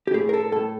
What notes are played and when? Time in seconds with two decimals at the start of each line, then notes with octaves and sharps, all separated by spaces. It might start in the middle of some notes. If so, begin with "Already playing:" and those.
0.07 G4
0.14 A2 G#4
0.29 A#4
0.34 A4
0.52 A2 A4